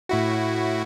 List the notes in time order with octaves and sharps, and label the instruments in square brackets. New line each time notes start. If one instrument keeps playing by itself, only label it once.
[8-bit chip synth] A2 E4 F#4